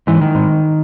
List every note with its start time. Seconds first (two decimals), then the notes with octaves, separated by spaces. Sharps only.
0.07 G#2 E3
0.21 D#3
0.35 G#2